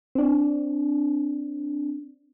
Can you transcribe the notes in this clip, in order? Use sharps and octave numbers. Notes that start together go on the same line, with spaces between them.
C4 D4